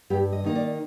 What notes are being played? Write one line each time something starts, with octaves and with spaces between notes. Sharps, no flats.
G2 G4
D#5
D#3 A#3 D#4
D5